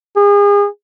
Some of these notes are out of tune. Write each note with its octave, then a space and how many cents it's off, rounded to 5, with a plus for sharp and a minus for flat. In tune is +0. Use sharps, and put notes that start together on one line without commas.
G#4 -35